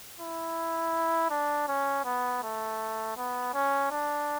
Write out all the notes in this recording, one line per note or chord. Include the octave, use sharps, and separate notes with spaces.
E4
D4
C#4
B3
A3
B3
C#4
D4